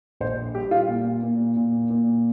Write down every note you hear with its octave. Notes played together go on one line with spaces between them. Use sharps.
A#1 C5
G3 G4
F4
A#2
A#2
A#2
A#2